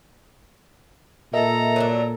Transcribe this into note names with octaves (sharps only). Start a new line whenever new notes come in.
A#2 A4 A#4 D#5 E5 A#5
F#3 A3 D4